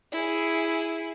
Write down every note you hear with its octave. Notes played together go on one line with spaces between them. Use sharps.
E4 G#4